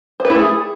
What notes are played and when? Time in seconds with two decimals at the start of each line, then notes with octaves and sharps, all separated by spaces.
0.20 C5
0.25 B4
0.30 E4
0.35 A3
0.40 G#4